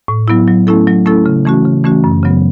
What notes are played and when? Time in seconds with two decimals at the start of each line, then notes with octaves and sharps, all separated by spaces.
0.08 A2
0.28 F#3 B3 E4
0.47 F#3
0.67 A3 C#4 E4 A4
0.87 F#3
1.06 A3 C#4 E4 A4
1.26 C#3
1.45 E3 A3 C#4 F#4
1.65 C#3
1.84 E3 A3 C#4 F#4
2.04 F#2
2.23 C#3 F#3 B3